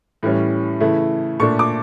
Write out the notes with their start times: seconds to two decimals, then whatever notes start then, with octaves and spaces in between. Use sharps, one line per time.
0.23 A2 E3 G3 C#4
0.80 C#3 E3 A3 E4
1.40 A#2 A3 D4 C#6
1.59 D6